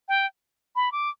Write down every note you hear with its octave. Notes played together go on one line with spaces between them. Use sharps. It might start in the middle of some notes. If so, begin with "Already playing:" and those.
G5
B5
D6